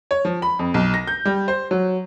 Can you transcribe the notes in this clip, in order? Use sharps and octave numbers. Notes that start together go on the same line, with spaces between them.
C#5
F3
B5
F2
B1
A#6
G6
G3
C5
F#3